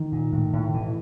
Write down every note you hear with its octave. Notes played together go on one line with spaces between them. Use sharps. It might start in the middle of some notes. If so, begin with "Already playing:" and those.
Already playing: D#3
A#2
A2
A2
B2 E3